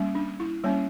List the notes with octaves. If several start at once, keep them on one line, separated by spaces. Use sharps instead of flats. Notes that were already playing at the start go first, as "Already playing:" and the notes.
Already playing: G3 A#3 C#4
D4
E4
G3 A#3 C#4 C#5